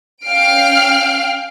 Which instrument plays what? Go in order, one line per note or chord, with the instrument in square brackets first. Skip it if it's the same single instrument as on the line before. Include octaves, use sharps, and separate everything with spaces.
[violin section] C#4 F5 G5 F6 C7 D7